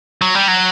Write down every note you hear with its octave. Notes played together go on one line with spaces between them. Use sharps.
F#3
G3
F#3